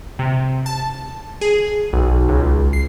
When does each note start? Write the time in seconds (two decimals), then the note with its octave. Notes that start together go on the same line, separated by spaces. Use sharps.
0.19 C3
0.66 A5
1.41 G#4
1.93 B1
2.29 C#2
2.73 C7